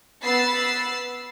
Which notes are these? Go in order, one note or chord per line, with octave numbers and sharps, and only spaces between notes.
B3 B5 E6 A6 C7